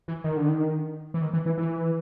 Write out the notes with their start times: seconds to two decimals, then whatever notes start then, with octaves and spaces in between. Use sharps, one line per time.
0.08 E3
0.24 D#3
0.37 D3
0.48 D#3
1.14 E3
1.22 D#3
1.33 E3
1.46 E3
1.58 E3